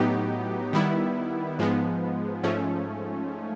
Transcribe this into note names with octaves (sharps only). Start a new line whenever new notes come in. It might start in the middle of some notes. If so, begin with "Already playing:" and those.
Already playing: A2 F#3 B3 D#4 G4
D#3 G3 B3 E4
G#2 F3 G#3 B3
G#2 F3 A3 C#4